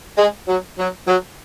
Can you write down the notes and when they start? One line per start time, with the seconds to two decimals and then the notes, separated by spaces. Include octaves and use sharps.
0.18 G#3
0.48 F#3
0.78 F#3
1.07 F#3